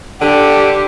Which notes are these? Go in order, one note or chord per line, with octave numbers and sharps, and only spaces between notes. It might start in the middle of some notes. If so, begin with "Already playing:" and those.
D3 G4